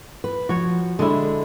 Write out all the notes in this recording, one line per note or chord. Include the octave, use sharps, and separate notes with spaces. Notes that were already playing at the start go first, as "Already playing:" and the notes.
B4
F3 F#4 C#5
D3 G#3 D4 E4